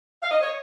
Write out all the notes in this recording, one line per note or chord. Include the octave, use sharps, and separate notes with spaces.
F5
D#5
C#5